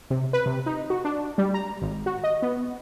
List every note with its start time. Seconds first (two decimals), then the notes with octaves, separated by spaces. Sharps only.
0.10 C3
0.33 B4
0.46 C3
0.66 D#4
0.90 F#4
1.05 D4
1.38 G3
1.54 A#5
1.82 G#1
2.06 F#4
2.24 D#5
2.42 B3